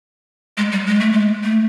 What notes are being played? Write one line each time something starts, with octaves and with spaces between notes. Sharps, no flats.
G#3
G3
G#3
A3
G#3
A3